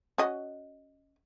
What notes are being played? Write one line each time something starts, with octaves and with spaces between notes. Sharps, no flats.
C#4 F#4 D#5